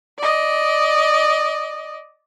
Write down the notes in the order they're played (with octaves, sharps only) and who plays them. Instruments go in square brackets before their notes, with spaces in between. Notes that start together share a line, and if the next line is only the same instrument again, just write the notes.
[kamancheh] D5 D#5